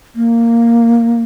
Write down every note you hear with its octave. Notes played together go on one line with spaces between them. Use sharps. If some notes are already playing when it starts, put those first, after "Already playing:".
A#3